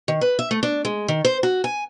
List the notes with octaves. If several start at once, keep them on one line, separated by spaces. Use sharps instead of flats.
D#3
B4
E5
A3
D4
G#3
D#3
C5
F#4
G#5